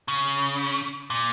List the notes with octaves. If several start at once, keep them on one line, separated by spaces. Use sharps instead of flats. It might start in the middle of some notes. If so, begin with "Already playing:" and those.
C#3
A#2